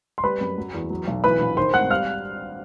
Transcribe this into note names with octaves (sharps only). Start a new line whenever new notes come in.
C6
G3 B4 B5
F#2
F#3
E2
F#3
B1
E3 B4 B5
A#1
D#3 C5 C6
G#1 F#5 F#6
G3 F5 F6